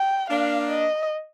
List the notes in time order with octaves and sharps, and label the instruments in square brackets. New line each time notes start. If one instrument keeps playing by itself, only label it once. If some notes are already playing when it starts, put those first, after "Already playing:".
Already playing: [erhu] G5
[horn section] A#3 D4 [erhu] F5
[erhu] D#5